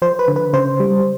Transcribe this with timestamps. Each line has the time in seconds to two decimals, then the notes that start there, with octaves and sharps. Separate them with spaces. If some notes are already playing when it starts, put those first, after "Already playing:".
0.02 F3 C5
0.19 B4
0.28 D3
0.36 B4
0.53 C#3 C5
0.80 G3